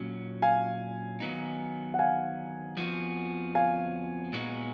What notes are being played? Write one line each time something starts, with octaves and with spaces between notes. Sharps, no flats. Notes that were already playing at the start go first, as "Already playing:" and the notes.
Already playing: A#2 F#3 C#4
F5 G#5
D#3 F#3 B3 D#4
F#5
F5 G#5
F2 F3 B3 F#4
F5 G#5
A#2 G#3 B3 D#4 F#4